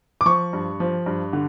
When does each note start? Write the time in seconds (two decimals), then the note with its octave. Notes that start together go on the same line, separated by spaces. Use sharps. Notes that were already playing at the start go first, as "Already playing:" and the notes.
0.21 D6
0.26 F3 C#6
0.53 G2
0.80 F3
1.06 G2
1.33 D3